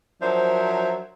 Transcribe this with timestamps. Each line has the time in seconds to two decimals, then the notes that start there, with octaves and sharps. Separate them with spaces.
0.22 F3 F#3 D4 A#4 C5 E5